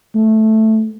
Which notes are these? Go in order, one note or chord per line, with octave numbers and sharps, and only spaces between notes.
A3